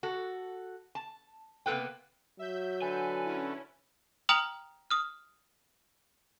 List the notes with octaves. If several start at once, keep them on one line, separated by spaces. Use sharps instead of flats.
F#4 A4
A5
C3 A#3 B3 A4 B4 G5
F#3 E5 G6
D3 A4 B4 G#5
C#4 E4
G5 A#5 D#6 F6 F7 F#7
D#6 F6